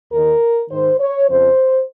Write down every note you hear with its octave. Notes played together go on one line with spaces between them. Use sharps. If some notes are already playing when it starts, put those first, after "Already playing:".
D#2 D#3 A#4
G#2 D#3 C5
C#5
F2 C#3 F3 C5